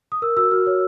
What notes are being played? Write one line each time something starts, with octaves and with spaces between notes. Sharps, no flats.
D#6
A#4 E6
F#4 E6
F#4 F6
C#5